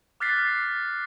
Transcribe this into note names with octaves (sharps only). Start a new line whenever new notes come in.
D6 F6 F#6 A6 B6 C7